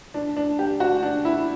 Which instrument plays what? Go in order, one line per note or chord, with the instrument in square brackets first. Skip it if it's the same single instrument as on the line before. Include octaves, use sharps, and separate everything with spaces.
[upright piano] D4
D4
G4
F#4
D4
E4